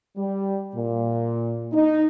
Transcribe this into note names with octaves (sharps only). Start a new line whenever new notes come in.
G3
A#2
D#4